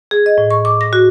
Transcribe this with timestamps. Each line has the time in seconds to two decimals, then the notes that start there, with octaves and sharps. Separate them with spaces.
0.11 G#4
0.26 D#5
0.38 A2
0.51 C#6
0.65 D6
0.81 A#6
0.93 F#4